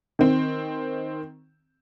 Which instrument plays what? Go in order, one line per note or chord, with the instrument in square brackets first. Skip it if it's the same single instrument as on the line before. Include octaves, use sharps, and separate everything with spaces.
[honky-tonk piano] D#3 C4